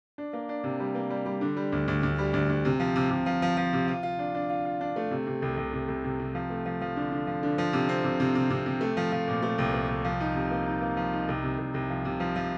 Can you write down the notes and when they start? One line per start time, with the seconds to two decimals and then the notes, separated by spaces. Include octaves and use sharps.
0.18 D4
0.33 A#3
0.49 D4
0.64 C3
0.80 G3
0.95 A#3
1.10 G3
1.26 G3
1.41 D3
1.57 G3
1.72 D2
1.88 D2
2.03 D2
2.19 G3
2.33 D2
2.49 D2
2.65 C3
2.80 F3
2.96 C3
3.10 C3
3.26 F3
3.42 F3
3.57 F3
3.73 C3
3.88 F4
4.03 F4
4.19 D4
4.34 D4
4.50 F4
4.65 F4
4.81 D4
4.96 A3
5.11 C3
5.27 C3
5.42 C2
5.57 C2
5.73 C3
5.88 C2
6.04 C3
6.19 C3
6.35 F3
6.50 A3
6.66 F3
6.81 F3
6.96 D3
7.12 D3
7.27 F3
7.43 D3
7.58 F3
7.73 C3
7.89 C4
8.04 C3
8.20 C3
8.35 C3
8.50 C3
8.66 C3
8.81 A3
8.97 F3
9.12 F3
9.28 A#2
9.43 A3
9.58 C2
9.74 A3
9.89 C2
10.04 F3
10.20 D#4
10.35 C3
10.51 A#3
10.66 D#4
10.81 A#3
10.97 F3
11.13 D#4
11.28 C2
11.43 C3
11.58 C2
11.74 C2
11.90 F3
12.05 C3
12.20 F3
12.36 F3